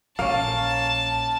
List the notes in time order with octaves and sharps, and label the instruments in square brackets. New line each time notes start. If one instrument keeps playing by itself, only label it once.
[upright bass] A#1 [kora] A#3 C#4 [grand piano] F5 [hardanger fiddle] A5